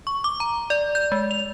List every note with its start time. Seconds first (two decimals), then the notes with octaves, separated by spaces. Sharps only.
0.07 C#6
0.24 D6
0.40 A#5
0.70 D5
0.95 G6
1.12 G#3
1.31 F7